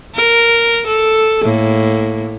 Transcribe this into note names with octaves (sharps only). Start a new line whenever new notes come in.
A#4
A4
A2 A#3